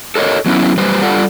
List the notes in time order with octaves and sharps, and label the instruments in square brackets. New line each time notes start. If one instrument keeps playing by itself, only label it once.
[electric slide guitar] A4 A#4 C#5 D#5
F#3 B3 C#4 E4
F#2 G3 B4 C5
G3 F4 A4 D5 F#5